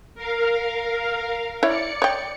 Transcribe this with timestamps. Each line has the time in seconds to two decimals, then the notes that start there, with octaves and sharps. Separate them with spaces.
0.15 A#4 F5
1.63 E4 C#5 D5 C#7
2.02 C#5 G5